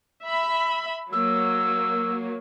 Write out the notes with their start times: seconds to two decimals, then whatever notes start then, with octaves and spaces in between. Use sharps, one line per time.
0.23 E5 B5
1.12 F#3 A#3 E6